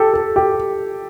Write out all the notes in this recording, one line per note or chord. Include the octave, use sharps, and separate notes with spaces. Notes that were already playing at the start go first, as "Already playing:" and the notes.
Already playing: G4 A4
A4
G4